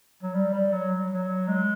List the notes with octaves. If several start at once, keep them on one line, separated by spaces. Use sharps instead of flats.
F#3
G3
G3
F#3
F#3
G#3